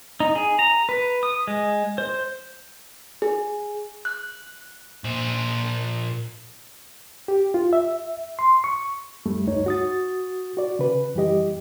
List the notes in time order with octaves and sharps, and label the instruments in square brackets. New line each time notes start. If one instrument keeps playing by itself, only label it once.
[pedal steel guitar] D#4
G#4
A#5
B4
D#6
G#3
C5
[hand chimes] G#4
F#6
[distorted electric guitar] A#2 C5
[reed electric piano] G4
F4
E5
C6
C#6
F#2 G3 A3
D2 G2 D#4 C#5
F#4 D#6 A6
F#4 D5
C#3 B4
F#2 E3 G3 G4 D#5